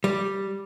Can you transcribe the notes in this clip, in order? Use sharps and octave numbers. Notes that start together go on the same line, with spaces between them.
G3